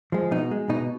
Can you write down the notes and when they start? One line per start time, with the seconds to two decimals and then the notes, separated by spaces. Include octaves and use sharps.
0.12 F3 G#3
0.31 B2 D#4
0.51 G#3
0.69 B2 D#4